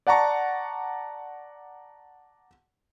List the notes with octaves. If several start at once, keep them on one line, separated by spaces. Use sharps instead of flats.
D5 F#5 A5 A#5 C#6